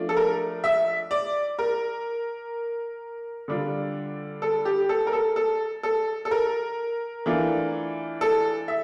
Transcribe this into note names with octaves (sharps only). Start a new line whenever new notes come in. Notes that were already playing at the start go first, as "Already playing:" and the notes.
Already playing: F3 A3 D4 F4
A4
A#4
E5
D5
A#4
D3 G3 D4 F4
A4
G4
A4
A#4
A4
A4
A4
A4
A#4
E3 A3 D4 F4
A4
E5